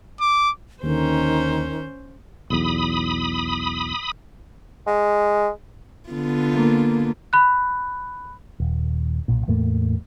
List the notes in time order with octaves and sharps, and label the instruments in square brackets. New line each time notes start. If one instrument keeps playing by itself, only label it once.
[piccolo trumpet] D6
[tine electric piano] D#2 D3 [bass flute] D#3 [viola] C#4 C5
[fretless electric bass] B1 E2 [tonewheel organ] B5 D#6
[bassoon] G#3
[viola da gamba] D3 B3 F4
[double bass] A#3
[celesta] B5 F#6
[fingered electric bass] D#1
B1 A#2
E2 A2 A3 A#3